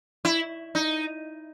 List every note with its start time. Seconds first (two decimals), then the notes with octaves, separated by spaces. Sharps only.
0.25 E4
0.75 D#4